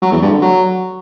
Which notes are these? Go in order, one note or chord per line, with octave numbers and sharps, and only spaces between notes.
F#3
E2
G2
D3
F#3